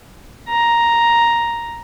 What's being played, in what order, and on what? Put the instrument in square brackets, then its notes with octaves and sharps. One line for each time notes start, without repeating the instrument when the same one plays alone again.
[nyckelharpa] A#5